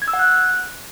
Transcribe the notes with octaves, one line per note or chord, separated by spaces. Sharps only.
G#6
E6
F#5
F#6